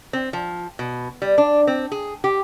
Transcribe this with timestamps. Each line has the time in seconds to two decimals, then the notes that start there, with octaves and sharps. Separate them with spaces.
0.13 C4
0.33 F3
0.79 B2
1.22 G3
1.38 D4
1.67 C4
1.92 G#4
2.24 G4